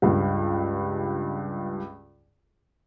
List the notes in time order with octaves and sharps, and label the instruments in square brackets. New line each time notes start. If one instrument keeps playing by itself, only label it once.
[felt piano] C#2 G2